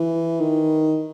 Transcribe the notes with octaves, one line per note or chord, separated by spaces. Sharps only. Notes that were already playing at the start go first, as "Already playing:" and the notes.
Already playing: E3
D#3